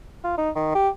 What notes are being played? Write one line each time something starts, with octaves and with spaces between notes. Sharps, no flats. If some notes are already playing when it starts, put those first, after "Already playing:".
F4
D#4
D#3
G4